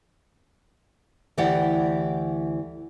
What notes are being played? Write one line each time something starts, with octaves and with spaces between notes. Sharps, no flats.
D2 E3 E4 G4 D5 F#5